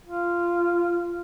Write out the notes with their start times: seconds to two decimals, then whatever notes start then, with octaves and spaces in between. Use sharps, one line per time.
0.06 F4